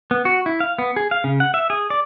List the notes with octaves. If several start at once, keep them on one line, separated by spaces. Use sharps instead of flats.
B3
F#4
E4
F5
B3
G#4
F5
C#3
F#5
E5
G#4
D5